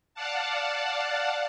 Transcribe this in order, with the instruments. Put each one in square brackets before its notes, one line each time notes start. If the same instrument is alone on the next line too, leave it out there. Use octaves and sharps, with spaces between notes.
[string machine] D5 F5 F#5 A5